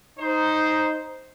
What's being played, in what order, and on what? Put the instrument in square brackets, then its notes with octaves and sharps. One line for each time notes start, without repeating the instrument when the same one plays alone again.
[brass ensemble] D#4 C5